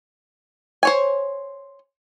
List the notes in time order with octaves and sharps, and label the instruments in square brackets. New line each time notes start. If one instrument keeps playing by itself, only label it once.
[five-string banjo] C5 C#5 G#5